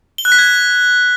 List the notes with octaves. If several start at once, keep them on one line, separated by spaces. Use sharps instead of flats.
G7
F#6
B6
G#6